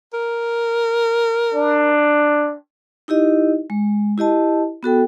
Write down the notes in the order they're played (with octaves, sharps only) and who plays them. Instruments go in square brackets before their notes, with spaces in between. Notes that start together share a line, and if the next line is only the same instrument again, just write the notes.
[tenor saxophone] A#4
[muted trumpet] D4
[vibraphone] D#4 E4 G4 D#5
G#3
E4 G4 D#5 A5
B3 F#4 A4 G5